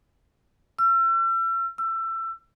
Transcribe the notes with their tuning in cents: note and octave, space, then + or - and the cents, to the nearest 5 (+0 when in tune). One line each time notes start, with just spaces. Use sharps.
E6 +40
E6 +25